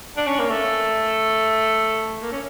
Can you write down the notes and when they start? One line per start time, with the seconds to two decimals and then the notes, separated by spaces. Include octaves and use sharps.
0.17 D4
0.27 C#4
0.39 A#3
0.50 A3
2.22 A#3
2.32 C#4